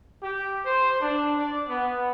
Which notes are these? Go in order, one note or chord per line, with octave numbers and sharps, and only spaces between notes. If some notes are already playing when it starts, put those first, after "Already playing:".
G4
C5
D4
D5
B3